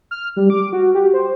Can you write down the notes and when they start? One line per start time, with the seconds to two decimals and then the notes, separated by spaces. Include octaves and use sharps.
0.11 F6
0.36 G3
0.50 D6
0.73 F#4
0.95 G4
1.13 C5